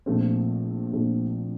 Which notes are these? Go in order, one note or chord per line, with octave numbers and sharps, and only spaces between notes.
A#1 A#2 F3 A3 C4
A#1 A#2 F3 A3 C4